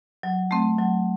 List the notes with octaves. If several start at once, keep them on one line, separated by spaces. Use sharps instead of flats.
F#3
A3 C4
F#3